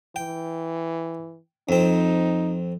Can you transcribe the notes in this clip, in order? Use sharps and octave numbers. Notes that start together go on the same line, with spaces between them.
E3 G5
F2 C4 D#4